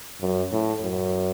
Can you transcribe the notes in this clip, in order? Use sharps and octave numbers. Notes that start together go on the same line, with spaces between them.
F#2
A2
F#2